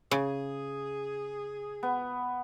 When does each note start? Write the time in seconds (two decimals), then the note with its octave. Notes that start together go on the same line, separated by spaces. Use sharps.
0.11 C#3 G#4
1.83 B3